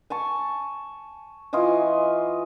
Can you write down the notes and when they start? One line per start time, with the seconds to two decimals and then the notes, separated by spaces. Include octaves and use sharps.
0.10 G#5 A5 C#6
1.53 E3 F4 D#5 G#5